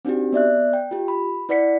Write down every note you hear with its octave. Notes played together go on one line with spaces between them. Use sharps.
C4 D4 D#4 F#4 G4
B3 D5 E5 F#6
G5
F4 G4
B5
E4 B4 D5 F#5 B6 C#7